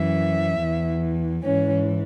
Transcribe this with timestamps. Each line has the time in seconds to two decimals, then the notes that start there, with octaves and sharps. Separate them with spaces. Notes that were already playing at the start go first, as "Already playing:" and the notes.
Already playing: F#2 E3 E5
0.60 E2 E3
1.44 G#2 E3 C#4